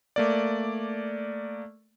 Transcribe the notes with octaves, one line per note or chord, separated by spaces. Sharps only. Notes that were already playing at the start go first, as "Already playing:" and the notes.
A3 A#3 D5